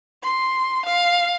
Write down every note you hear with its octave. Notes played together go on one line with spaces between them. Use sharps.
C6
F5